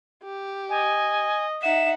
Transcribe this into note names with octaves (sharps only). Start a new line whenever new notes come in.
G4
D#5 G#5
D#4 E5 F#5 E7